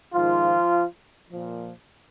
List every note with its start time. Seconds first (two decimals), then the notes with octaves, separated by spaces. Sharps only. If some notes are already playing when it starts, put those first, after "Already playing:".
0.13 G#2 D#3 F3 F4
1.30 A#2 F3